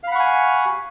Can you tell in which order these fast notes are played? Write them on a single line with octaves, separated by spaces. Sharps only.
F5 B5 F#5 C#6 G#5